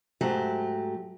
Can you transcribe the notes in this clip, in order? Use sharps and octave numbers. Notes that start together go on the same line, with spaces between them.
G#2 F#3 A3 G4